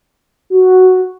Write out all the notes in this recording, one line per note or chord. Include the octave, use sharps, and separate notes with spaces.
F#4